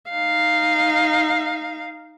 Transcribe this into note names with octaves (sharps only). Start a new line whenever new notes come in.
D#4 F5